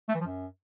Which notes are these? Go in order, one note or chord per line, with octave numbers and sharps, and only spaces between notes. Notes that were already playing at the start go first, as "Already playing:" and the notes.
A3
E3
F3
F#2